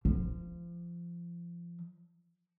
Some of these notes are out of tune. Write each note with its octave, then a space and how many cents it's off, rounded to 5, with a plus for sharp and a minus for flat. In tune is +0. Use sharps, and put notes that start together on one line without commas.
F3 -25